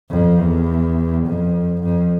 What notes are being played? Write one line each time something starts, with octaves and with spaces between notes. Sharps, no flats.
F2
E2
F2
F2